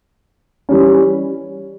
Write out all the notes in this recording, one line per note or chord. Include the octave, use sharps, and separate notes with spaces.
E3 G3 C#4